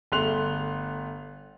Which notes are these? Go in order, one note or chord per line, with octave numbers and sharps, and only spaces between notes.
G1 A3 C6 F#6 F7